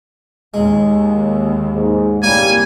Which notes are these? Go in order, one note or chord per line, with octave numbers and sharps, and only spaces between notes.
D#2 G#3
G#2
C2 A2 G3 A#3 C#5 G#5